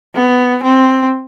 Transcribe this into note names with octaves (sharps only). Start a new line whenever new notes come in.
B3
C4